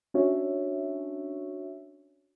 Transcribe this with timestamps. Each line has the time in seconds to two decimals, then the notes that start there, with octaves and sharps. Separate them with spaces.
0.14 C#4 D4 F#4 C#5 E5